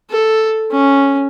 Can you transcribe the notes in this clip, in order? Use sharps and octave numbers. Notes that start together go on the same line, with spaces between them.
A4
C#4